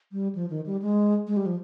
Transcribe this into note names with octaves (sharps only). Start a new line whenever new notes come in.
G3
F3
D#3
G3
G#3
G#3
G3
F3